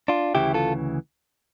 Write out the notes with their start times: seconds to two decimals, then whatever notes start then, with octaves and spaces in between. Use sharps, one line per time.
0.08 D4 F4
0.35 D2 C#3 E3 E4 G4
0.54 F4 A4